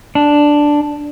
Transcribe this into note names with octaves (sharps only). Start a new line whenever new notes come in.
D4